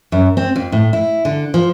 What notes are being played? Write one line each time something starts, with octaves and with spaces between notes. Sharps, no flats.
F#2
C4
F2
A2
E4
D3
F3